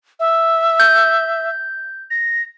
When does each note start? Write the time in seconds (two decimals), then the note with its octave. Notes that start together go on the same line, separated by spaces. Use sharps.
0.20 E5
0.80 G6
2.11 A#6